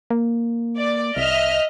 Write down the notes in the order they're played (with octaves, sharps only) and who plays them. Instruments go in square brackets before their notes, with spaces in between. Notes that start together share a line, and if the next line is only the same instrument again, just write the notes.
[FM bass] A#3
[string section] D5
[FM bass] C2 [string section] D#5 E5 F6